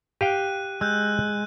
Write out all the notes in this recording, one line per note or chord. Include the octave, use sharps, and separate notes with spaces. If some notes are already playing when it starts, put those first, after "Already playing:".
G4 F5 G5 F#6 D#7
G#3 E6 F#6 G6